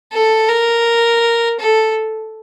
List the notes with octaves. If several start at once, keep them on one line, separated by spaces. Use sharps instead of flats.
A4
A#4
A4